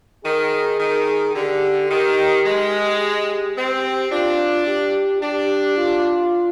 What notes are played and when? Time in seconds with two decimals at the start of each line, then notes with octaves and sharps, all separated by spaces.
0.25 D#3 G#4
0.79 D#3
1.35 D3 G4
1.91 D#3 G4
2.46 G#3
3.56 C4 G4
4.12 D4 F4
4.67 G4
5.22 D4 G4
5.78 F4